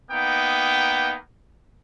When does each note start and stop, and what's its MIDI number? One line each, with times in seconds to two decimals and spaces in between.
0.11 1.15 58
0.11 1.15 59
0.11 1.15 63
0.11 1.15 79